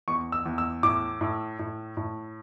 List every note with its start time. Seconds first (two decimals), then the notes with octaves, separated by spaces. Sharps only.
0.08 E2 C#6
0.32 E6
0.46 E2
0.58 E6
0.83 A2 D6
1.21 A2
1.59 A2
1.97 A2